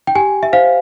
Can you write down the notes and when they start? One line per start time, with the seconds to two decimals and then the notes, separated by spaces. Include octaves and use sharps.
0.07 G5
0.15 G4 G#5
0.43 E5
0.53 C5 F5